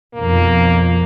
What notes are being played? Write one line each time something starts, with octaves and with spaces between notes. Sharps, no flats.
B1 F2 A#3